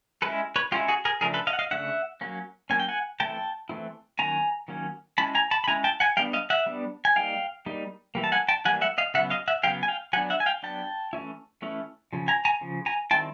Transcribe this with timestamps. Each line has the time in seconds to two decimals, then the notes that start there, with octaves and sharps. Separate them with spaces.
0.22 G#3 C#4 E4 A4 B4
0.56 B4 C#5
0.72 G#3 C#4 E4 F4 G4
0.88 F#4 G#4
1.05 G#4 A#4
1.21 C#3 F3 A3 D4 G#4 A#4
1.34 A4 B4
1.47 D#5 F5
1.53 F#5
1.59 D#5 F5
1.71 C#3 F3 A3 D4 E5 F#5
2.21 F#3 A#3 C#4
2.70 F#3 A#3 C#4 G#5
2.80 G5
2.88 F#5 G#5
3.20 E3 A3 C4 E4 G5 A5
3.69 E3 A3 C4 E4
4.19 D#3 F#3 A#3 C#4 G#5 A#5
4.68 D#3 F#3 A#3 C#4
5.18 G#3 C#4 E4 A5 B5
5.35 G#5 A#5
5.51 A5 B5
5.64 B5
5.68 G#3 C#4 E4 G#5 A#5
5.84 G5 A5
6.00 F#5 G#5
6.17 G3 B3 D4 F5 G5
6.33 D#5 F5
6.50 E5 F#5
6.66 G3 B3 D4
7.05 G#5
7.16 G3 A#3 D#4 F5 G5
7.66 G3 A#3 D#4
8.15 E3 G3 A#3
8.24 A5
8.32 F#5 G#5
8.48 G5 A5
8.65 E3 G3 A#3 F#5 G#5
8.81 E5 F#5
8.98 D#5 F5
9.14 C#3 F#3 B3 E5 F#5
9.30 D#5 F5
9.48 E5 F#5
9.63 C#3 F#3 B3 F5 G5
9.83 G#5
9.88 F5 G5
10.13 F#3 B3 D4 F#5 G#5
10.30 E5 F#5
10.40 G#5
10.46 F5 G5
10.63 F#3 B3 D4 G5 A5
11.13 E3 A3 C#4 E4
11.62 E3 A3 C#4 E4
12.13 C#3 F3
12.28 G#5 A#5
12.45 G#5 A#5
12.61 C#3 F3
12.86 G#5 A#5
13.11 D#3 G3 C4 E4 G5 A5